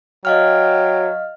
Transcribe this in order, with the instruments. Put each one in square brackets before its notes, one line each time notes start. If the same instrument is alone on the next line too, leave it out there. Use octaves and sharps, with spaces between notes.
[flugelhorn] F#3 [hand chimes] D#5 F5 F6 [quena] G5